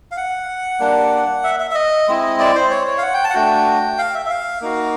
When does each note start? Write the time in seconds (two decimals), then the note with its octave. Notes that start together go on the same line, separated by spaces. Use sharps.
0.11 F5
0.17 F#5
0.80 G3 A#3 D4
1.44 E5
1.60 E5
1.71 E5
1.75 D#5
2.08 G#3 C4 E4
2.40 D5
2.55 C5
2.71 C#5
2.87 C#5
2.98 F5
3.02 F#5
3.14 G5
3.24 A5
3.30 F#5
3.34 A3 D4 F#4 G5
3.98 F5
4.15 E5
4.26 E5
4.30 F5
4.61 A#3 D#4 F#4